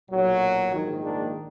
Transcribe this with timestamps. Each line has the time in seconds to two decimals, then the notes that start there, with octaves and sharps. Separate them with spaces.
0.11 B1 A#2 F#3
0.74 A#1 G#2 D#3
1.04 A#3 D4